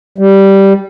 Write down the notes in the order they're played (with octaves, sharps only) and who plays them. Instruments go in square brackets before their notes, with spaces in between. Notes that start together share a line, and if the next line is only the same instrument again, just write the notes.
[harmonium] G3